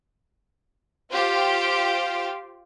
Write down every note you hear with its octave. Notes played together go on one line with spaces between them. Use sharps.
F4 G4 C5 F5 G5